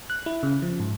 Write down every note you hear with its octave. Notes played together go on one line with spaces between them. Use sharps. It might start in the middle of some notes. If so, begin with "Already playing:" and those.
F#6
E4
C#3
F3
G#2